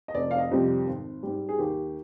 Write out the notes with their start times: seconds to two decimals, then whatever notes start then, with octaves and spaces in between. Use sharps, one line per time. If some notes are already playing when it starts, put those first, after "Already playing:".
0.08 D#5
0.14 F1 D5
0.31 F5
0.38 D#5
0.51 F2 C3 G3 C4
0.86 G#1
1.23 G#2 G3
1.49 G#4
1.59 D#2 G4